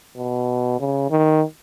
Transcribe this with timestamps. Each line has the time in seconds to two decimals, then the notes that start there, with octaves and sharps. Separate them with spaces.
0.17 B2
0.80 C#3
1.11 D#3